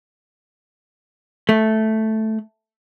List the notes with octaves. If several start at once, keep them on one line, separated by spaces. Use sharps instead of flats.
A3